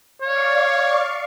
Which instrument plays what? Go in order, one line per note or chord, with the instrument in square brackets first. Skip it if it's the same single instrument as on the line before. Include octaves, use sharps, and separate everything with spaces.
[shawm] C#5 [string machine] D5 F5 C#6